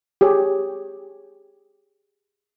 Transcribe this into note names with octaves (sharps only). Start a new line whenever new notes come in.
G4 G#4 C#5